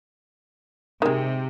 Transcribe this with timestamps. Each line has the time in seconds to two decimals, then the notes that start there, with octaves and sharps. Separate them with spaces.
1.02 C3 D#3 G#3